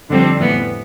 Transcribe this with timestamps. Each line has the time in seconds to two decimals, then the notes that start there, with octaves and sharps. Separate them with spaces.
0.10 F2 D3 G3 C4
0.39 A2 E3 G3 B3